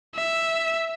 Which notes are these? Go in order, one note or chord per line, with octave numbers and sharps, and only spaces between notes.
E5